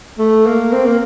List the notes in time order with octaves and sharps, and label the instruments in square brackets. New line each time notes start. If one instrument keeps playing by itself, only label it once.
[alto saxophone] A3
A#3
C4
A#3